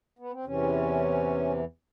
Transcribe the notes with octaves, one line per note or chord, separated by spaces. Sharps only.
B3
C4
E2 C3 E3 C#4